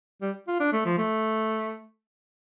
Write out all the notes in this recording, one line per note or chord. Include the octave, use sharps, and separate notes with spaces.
G3
F4
D4
A3
F3
A3